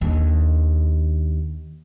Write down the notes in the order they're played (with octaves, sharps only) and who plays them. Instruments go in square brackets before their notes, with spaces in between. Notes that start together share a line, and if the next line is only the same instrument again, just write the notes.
[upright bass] D#2 D4